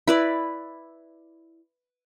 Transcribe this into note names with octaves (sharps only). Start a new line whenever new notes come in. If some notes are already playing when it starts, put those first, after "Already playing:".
E4 B4 D5